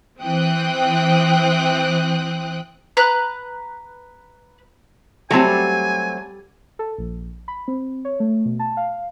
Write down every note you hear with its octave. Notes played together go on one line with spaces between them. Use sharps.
E3 C4 G5 D#6 F#6
B4 A#5 F#6
F#3 G3 A3 C4 A4 G#5
A4
A#1
B5
C4
C#5
A3
B2
A5
F5